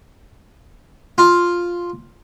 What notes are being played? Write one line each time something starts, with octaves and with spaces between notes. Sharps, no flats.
F4